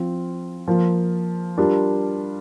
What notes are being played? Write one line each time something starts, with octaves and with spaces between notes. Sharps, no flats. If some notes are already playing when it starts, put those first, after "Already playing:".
Already playing: F3 C4 F4
F3 A#3 F4
G3 D4 F4 A#4